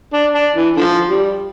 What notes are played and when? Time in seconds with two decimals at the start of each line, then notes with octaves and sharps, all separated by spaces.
0.13 D4
0.34 D4
0.56 E3
0.77 D3 F3
1.09 G3